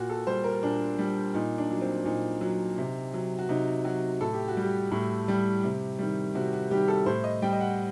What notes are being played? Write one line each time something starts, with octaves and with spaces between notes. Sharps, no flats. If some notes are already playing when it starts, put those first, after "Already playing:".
Already playing: A#2 F#4
A4
G3 C5
A#4
A#2 D4
G3
A#2 D#4
D4
F#3
C4
A#2 D#4
F#3
C3
F#3
F#4
C3 D#4
F#3 F#4
A2 A4
G4
F#4
G3
G4
A2
G3
C3
D#3 G3
C3 F#4
F#4
D#3 G3 G4
A4
A2 C5
D#5
G3 G5
D#5
F#5